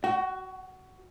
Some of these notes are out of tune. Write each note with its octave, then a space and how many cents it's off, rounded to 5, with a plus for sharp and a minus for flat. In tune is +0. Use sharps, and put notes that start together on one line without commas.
F#4 +15 G5 -40